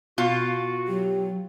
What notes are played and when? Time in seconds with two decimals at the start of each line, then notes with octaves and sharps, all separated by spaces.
0.18 B2 F4 F#4
0.88 F#3 G4